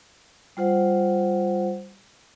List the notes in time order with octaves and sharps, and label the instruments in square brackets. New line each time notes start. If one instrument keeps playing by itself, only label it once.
[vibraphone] G3 F4 C5 F#5